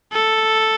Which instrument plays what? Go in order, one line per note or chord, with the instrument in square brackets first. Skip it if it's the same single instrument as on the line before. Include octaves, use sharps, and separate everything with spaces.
[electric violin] A4